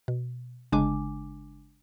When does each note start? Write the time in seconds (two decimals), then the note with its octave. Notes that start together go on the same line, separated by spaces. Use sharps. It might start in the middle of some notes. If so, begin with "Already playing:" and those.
0.08 B2
0.72 G1 C#3 G#3 D4 G#5 D6